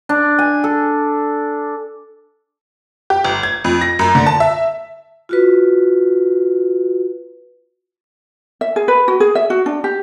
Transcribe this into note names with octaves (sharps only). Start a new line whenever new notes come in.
D4
G#5
A4
G4
G1
G#6
F2
A#6
F#2
D3
A5
E5
F4 F#4 B4
E5
G#4
B4
F#4
G#4
E5
F#4
D4
G4